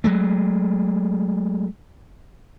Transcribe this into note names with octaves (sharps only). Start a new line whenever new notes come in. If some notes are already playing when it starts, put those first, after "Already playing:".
F#3 G#3 A3